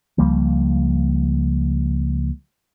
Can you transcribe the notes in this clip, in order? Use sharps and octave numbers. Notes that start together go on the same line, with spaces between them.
C#2 F3 G3 A#3